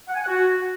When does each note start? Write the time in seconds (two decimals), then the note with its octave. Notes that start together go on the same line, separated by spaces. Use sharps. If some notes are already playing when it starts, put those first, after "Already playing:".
0.08 F#5
0.14 G#5
0.21 F#5
0.27 F#4